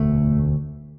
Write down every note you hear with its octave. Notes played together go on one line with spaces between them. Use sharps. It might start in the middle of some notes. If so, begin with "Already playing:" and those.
Already playing: E1 D2 D3 A3